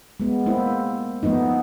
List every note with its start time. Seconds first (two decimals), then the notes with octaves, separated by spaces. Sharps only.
0.20 G#3 B3
0.46 A#3 C4 E4
1.23 F3 A3 B3 D#4